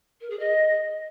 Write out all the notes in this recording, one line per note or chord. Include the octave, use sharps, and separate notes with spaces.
A#4
G#4
D#5